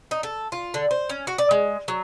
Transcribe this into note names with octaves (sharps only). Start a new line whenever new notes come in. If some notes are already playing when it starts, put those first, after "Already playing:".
D#4
A4
F4
D3
C5
C#4
F#4
D5
G#3
F#3